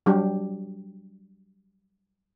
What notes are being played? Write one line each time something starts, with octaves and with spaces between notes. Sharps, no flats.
F#3 G3 D4 G4